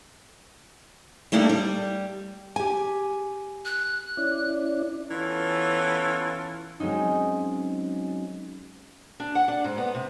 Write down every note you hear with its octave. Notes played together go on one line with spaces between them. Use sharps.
G3 A3 A#3 D4 D#4
G3
G4 G#5
F#6
C#4 E4 D5
E3 B3 C#4 F4 A4
F#3 G#3 C4 C#4 D#4
D4
F#5
D4
G#2
B3
C3